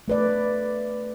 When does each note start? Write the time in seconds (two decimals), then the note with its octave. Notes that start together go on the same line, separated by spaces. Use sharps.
0.08 A3 B4 D5